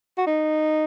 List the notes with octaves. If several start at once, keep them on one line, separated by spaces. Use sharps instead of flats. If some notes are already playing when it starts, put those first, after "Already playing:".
F#4
D#4